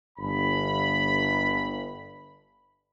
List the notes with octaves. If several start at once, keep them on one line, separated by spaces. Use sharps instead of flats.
G1 B5